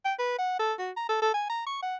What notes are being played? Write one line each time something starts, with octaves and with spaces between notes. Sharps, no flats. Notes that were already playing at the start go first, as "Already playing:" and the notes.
G5
B4
F#5
A4
F#4
A#5
A4
A4
G#5
A#5
C#6
F#5